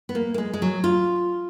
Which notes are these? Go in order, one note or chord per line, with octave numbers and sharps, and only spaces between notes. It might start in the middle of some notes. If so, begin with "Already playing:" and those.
B3
A#3
A#3
G#3
G#3
F#3
F4